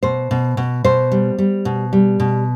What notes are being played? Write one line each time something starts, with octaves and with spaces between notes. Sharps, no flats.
B2 C5
B2
B2
B2 C5
G3
G3
B2
G3
B2